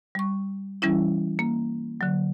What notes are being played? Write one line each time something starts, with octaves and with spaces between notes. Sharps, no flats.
G3 C#6
E3 G3 C#4 E4
A#3
D3 F#3